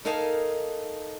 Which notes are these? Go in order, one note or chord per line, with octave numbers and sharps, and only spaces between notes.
D#4 A4 A#4 F5 G#5 A5